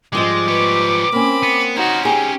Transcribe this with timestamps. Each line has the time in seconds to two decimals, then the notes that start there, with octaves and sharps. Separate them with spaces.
0.12 G#2 F3 G3 G#3 D6
0.48 G4 B4 C#5
1.12 A#3 C4 C#4 B5
1.43 B3
1.76 C#4 D#4 F#4 C5
2.05 G4 G#4